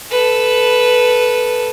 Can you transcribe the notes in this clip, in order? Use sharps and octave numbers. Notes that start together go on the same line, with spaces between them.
A4 B4